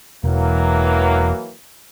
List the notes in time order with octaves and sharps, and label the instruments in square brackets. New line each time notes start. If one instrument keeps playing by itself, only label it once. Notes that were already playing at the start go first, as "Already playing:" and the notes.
[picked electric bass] E1 [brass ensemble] E3 F#3 A#3